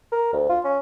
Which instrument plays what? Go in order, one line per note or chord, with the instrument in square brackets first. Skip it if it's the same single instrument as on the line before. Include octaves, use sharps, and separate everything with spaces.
[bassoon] A#4
D2
F4
C#4